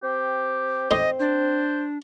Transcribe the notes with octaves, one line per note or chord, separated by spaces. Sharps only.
C4 G4
A2 C4 D#4 D#5 C6
D4 C5